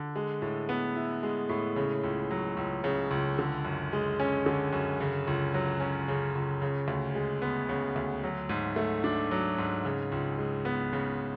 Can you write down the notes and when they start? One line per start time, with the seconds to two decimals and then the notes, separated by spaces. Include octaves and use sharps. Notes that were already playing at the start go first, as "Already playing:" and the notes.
Already playing: D3
0.16 G#3
0.42 A2
0.69 B3
0.96 E4
1.23 G#3
1.49 A2
1.76 C#3
2.04 C#2
2.31 F#3
2.57 C#2
2.84 C#3
3.11 C#2
3.39 D3
3.65 F#2
3.93 G#3
4.20 C#4
4.46 D3
4.73 F#2
5.00 C#3
5.27 C#2
5.54 F#3
5.80 C#4
6.08 C#3
6.35 C#2
6.62 C#3
6.88 D2
7.15 G#3
7.42 B3
7.69 C#3
7.96 D2
8.24 F#3
8.49 G#2
8.76 A3
9.04 D4
9.31 F#3
9.58 G#2
9.85 C#3
10.12 C#2
10.38 G#3
10.65 B3
10.93 C#3